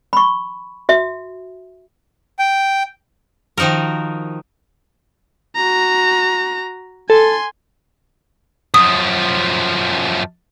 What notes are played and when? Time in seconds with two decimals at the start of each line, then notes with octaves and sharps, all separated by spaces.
0.13 B5 C#6
0.89 F#4 E5
2.39 G5
3.58 D#3 F3 D#4 F#4 A#4
5.56 F#4 A#5
7.10 A4 G#5 C6
8.74 F#2 F3 D#6